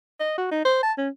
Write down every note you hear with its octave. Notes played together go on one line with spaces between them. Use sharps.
D#5
F#4
D#4
C5
A5
C#4